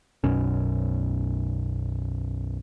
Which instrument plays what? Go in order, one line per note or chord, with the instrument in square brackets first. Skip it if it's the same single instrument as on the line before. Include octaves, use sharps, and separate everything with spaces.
[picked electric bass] B1 F#2 B2 C#4